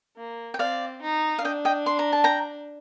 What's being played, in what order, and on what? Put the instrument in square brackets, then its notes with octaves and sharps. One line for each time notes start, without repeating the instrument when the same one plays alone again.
[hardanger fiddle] A#3
[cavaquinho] G5
[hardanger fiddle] C4 [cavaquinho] D5 F5
[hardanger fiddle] D#4
[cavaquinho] F5
[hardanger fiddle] D4 [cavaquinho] D#5 G5
[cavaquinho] D#5 G5
C6
A#5
A5
G5 A#5